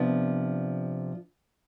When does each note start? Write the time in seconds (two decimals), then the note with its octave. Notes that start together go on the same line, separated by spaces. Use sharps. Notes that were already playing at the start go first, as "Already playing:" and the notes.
Already playing: C3 F3 B3 D4